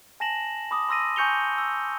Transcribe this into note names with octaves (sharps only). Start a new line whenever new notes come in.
G#5 A5 A#6 E7 F#7
B5 D6 D#6
B5 C6 E6 A#6 D#7
G#5 C#6 G6 C#7 F7 G7
E6